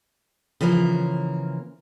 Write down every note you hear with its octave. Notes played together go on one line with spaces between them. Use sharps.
C#3 E3 F3 A#3 A#4